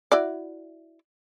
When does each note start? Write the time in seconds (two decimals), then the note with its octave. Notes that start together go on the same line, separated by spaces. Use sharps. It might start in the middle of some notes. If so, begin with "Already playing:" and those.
0.12 E4 F#4 D5